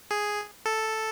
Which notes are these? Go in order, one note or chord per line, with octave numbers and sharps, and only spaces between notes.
G#4
A4